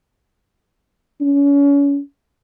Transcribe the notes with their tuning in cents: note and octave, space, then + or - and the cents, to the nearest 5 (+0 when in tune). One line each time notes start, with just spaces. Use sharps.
C#4 +35